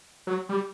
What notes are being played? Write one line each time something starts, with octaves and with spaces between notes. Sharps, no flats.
F#3
G3